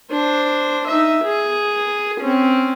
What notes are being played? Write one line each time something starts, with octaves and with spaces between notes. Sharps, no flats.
D4 C5
D#4 E5
G#4
C4 C#4